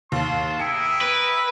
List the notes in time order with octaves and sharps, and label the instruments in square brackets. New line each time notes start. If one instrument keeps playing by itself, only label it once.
[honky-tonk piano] D#2 [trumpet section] A5 C6
[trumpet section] E4 G#4 A#4 [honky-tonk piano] G5 C#7
[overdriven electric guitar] B4